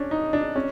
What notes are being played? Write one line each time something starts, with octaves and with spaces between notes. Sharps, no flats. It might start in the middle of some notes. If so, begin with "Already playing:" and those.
Already playing: C#4 D4
D#4
D4
C#4